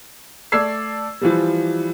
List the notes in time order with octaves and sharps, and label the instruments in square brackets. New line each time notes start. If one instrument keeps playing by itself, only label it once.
[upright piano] A3 A4 D5 E6 G#6 C7
E3 F3 G3